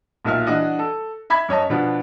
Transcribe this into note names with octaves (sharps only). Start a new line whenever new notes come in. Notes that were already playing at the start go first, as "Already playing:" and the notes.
B1 A#2 E5 F6
E3 D4 F#4 D#5 F#5
A4
E5 B5 G#6 B6
F#2 C#5 D#5 A5
B2 F3 B3 D4